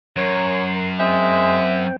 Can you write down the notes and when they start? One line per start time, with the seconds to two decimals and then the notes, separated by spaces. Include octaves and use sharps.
0.17 F#2 A#4 C#5 C6
1.00 G#3 C4 E5 G5